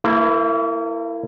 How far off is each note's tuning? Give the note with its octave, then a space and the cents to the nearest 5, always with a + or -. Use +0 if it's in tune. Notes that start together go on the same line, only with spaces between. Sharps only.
A#3 -35 E4 +10 B4 +0